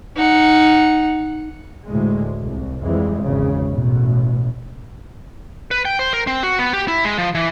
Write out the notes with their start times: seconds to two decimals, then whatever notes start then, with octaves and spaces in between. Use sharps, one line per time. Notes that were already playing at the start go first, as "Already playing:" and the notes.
0.16 D#4 F#5
1.85 D2 A2 G#3
2.40 C2
2.82 F2 E3 G3 G#3
3.21 G#1 E2 C#3
3.68 A1 B2
5.71 B4
5.85 G5
5.99 C5
6.13 A#4
6.27 C4
6.43 F#4
6.59 B3
6.73 G4
6.88 E4
7.05 G#3
7.18 F3
7.35 E3